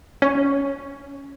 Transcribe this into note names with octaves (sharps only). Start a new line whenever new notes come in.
C#4